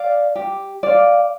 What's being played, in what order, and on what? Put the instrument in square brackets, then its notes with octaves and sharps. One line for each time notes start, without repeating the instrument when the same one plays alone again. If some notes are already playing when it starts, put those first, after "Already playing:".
Already playing: [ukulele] D5 F5
G4
D5 F5